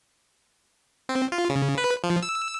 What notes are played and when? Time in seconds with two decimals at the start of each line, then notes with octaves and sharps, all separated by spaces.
1.09 C4
1.32 F4
1.49 C#3
1.78 B4
2.04 F3
2.23 E6